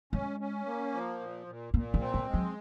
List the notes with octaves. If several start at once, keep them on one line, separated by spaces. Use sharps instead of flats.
G#3 C#4
C#4
A#3
F3
A#2
A#2
A#2 A#3
G#3
C4
G#3
G#3
F#3